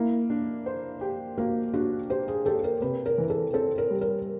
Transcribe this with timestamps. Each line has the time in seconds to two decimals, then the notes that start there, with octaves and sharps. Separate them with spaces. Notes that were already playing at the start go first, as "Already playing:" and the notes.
Already playing: A#3 E4
0.30 D4
0.66 C5
1.01 G4
1.38 A#3 F#4
1.74 D4 F#4
2.10 G4 C5
2.28 G#4
2.46 G4 A4
2.64 A#4
2.81 C3 B4
3.06 A#4
3.18 E3
3.30 A4
3.53 C4 A4
3.78 A#4
3.90 G3
4.01 A#4